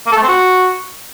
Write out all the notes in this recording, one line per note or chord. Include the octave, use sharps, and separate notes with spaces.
A#3
A4
A3
C4
F#4